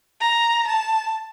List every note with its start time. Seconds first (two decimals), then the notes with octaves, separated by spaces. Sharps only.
0.21 A#5
0.67 A5